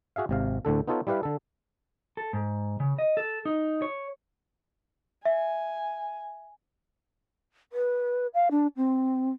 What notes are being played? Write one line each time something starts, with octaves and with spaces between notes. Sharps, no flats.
F#4 G#4 E5 F5
G#1 C3 F5
D2 A2 D3 A4
B3 D#4 F4 A4 C#5
G3 E4 G4 B4 F5
D3 A4
A4
G#2
C#3
D#5
A4
D#4
C#5
E5 G#5
B4
F5
D4
C4